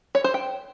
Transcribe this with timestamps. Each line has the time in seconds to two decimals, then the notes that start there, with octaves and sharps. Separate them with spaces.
0.15 C#5
0.24 C5
0.34 G5